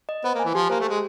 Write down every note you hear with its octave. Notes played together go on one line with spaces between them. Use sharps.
D#5
B3 C5
A#3
G#5
E3
F3 G4
A#3 C5
A3
G#3 G4